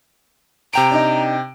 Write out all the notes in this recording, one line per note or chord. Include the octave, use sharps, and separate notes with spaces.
C3 G5 A#5 D7
D4 D#4 D#5